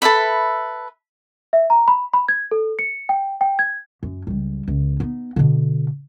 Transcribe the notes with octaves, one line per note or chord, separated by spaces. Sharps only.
A4 B4 E5 B5
E5
A#5
B5
B5
G#6
A4
C#7
G5
G5
G#6
F#2
C#2 G3
C#2
B3 D#4
B2 D3